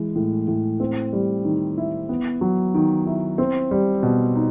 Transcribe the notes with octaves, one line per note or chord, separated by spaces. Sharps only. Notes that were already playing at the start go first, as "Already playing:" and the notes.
Already playing: E3 G#3
A2
A2
C4
G3
D#3
E4
B3
F#3
D#3
E4
C4
G3
B2
D#4